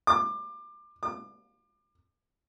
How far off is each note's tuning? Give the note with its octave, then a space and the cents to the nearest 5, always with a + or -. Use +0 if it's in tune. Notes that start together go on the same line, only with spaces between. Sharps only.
D6 +25
D6 +35